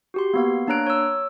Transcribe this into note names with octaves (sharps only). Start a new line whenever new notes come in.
F#4 G4 C6
A#3 B3 F5
A#3 D4 C#5 A#5 F#6 D7
C#5 E6